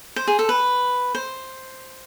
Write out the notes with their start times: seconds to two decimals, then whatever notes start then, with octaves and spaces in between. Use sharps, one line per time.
0.16 C5
0.27 G#4
0.39 A4
0.49 B4
1.15 C5